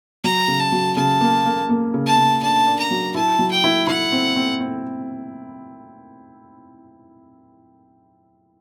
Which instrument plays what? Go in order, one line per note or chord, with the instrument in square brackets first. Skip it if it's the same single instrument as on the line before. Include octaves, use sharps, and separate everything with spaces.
[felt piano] F#3 [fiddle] A#5
[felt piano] C#3
[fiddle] A5
[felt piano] F#3
[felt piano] C#3 [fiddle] A5
[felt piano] A#3
A#3
A#3
C#3
[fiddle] A5
[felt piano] C#3
[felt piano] D4 [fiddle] A5
[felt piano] D4
[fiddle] A#5
[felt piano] F#3
[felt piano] E4 [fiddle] A5
[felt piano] F#3
[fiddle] G5
[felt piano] E4
[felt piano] E4 [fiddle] F#5
[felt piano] C4
C4
C4